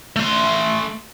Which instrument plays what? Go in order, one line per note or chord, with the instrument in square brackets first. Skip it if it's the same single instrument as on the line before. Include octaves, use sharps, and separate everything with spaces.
[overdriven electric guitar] A3 C6